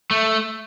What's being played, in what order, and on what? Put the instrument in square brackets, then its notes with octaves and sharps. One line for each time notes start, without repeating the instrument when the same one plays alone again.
[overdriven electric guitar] A3